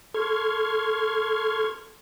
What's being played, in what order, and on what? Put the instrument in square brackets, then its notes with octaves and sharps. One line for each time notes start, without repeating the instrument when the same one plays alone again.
[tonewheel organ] A4 C6 C#6 F6 G#6